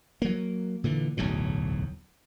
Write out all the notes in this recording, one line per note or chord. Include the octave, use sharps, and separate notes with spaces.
F#3 A#3
A#2 D3 E3
D1 B1 E2 A2